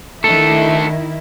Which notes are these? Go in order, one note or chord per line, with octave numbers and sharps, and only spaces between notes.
D#3 A3 D4 E4 A4